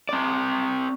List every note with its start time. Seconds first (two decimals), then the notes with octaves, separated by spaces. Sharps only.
0.09 C4 D5